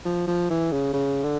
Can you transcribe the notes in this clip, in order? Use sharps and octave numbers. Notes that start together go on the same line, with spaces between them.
F3
F3
E3
C#3
C#3
D3